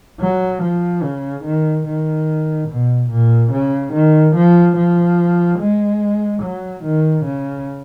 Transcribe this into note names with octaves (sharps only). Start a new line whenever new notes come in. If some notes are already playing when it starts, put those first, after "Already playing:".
F#3
F3
C#3
D#3
D#3
B2
A#2
C#3
D#3
F3
F3
G#3
F#3
D#3
C#3